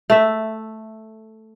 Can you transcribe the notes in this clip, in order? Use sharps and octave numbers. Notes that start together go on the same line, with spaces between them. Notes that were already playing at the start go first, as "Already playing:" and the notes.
A3 E5